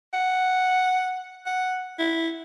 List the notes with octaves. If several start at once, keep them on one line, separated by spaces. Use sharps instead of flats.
F#5
F#5
E4